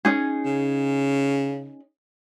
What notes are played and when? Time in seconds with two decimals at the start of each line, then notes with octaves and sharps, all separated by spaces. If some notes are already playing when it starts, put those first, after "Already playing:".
0.05 C#4 D#4 G#4
0.45 C#3